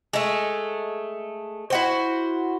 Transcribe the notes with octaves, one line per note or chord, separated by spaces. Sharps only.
G#3 A3
E4 F#4 C5